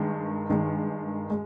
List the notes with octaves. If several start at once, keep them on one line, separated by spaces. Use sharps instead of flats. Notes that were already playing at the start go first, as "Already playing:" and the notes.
Already playing: G2 D#3 G#3
G2 D#3 G#3
G#3